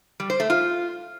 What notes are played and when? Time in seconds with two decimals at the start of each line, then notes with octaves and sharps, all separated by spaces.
0.20 G3
0.30 C5
0.40 A3
0.50 F4